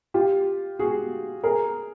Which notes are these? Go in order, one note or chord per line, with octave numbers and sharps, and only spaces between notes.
F4 G4
F#4 G#4
G#4 A#4